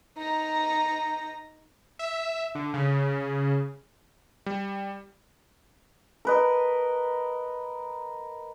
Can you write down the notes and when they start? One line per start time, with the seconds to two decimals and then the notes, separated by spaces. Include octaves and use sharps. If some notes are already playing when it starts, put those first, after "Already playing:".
0.17 D#4 A#5
1.99 E5
2.55 D3
2.74 C#3
4.46 G3
6.25 A#4 B4 D#5